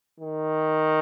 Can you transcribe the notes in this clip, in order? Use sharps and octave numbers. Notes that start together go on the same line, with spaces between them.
D#3